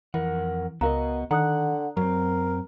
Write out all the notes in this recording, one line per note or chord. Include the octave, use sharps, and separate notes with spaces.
F2 E3 A#4 F#5
C#2 B3 F#4 A#4 D#5 F5 A#5
D3 D#3 F#5 A#5 D#6 F#6
F#2 F#3 C4 A#4